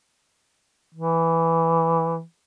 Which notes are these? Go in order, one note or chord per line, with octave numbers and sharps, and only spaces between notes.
E3